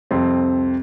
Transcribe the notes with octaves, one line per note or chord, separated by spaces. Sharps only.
C2 F2 C4